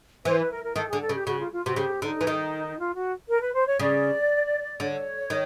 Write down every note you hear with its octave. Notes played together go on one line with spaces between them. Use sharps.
E3 C5
B4
A#4
A#4
D#3 A4
D3 G#4
A4
C#3
G4
C#3 F#4
F4
F4
C3 F#4
C#3 G4
D3 D#4
E3
D#3
F4
F#4
A#4
B4
C5
C#5
C#3 D5
D3 C#5
D#3